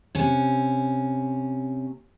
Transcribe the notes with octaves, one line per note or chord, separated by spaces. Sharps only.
C3 C#4